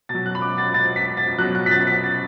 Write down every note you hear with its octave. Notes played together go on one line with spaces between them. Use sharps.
B2 F#3 A6
F#6
B5
D6
A6
A6
B6
A6
B2 F#3 F#6
F#6
B6
A6
B6
A6